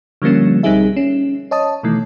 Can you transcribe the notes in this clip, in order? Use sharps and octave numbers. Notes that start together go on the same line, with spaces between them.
D3 F3 G3 A#3 C#4
B1 G3 C4 D#4 G#4 E5
C#4
C#5 D#5 A5 D#6
B2 D#3 E3 A3